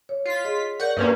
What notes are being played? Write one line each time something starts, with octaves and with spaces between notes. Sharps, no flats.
C#5
F4 B6
G#4 D#5
A#4 D5 F#5 C#6 G6
G2 A#3 C#4 B4 C5